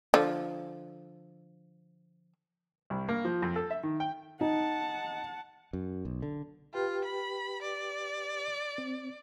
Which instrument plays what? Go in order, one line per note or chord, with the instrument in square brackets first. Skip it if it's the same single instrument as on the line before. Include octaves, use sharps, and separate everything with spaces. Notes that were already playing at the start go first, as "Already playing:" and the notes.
[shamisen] D3 F3
[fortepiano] C2
A#3
F3
F2
A4
E5
D#3
G5
[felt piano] D#4 [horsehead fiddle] F#5 A5
[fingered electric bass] F#2
B1
D3
[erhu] F4 [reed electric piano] G4 B4 G5
[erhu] B5
D5
[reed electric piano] C4